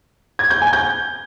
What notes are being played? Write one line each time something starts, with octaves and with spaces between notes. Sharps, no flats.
G#6
G6
G#5
G6